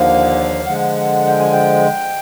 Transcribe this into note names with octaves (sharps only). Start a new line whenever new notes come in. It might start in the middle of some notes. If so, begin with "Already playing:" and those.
Already playing: D#2 D3 F3 A#3 F5
D3 F3 G#3 F#5
G5
G#5
G5